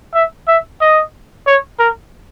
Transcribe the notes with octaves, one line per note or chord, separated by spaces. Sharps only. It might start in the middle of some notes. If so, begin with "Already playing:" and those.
E5
E5
D#5
C#5
A#4